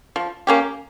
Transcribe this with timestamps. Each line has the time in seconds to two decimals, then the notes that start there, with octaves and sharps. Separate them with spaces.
0.16 F3
0.47 A#3 C#4 G4